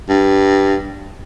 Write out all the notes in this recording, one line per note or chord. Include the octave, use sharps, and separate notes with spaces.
G2